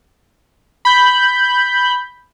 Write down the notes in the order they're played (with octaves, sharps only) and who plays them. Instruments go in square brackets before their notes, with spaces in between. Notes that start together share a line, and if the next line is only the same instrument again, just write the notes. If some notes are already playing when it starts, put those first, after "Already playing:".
[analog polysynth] B5 G6